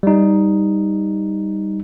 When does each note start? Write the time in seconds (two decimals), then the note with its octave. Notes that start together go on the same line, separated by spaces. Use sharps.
0.03 G3 D#4